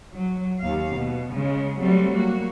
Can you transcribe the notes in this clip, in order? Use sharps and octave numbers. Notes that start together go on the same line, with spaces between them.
F#3
D#2 F5
B2
C#3 G#3
F#3 G3 A3 C4
A#3 F#4